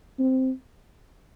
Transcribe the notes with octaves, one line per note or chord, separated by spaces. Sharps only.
C4